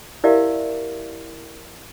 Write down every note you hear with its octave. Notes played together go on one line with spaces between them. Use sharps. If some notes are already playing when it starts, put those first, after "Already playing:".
E4 G4 A#4 D5 E5 F5